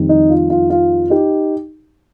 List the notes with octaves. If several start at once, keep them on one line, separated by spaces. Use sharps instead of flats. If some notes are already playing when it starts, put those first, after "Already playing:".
Already playing: F2 D#3 G3
D#4
F4
F4
F4
D#4 G4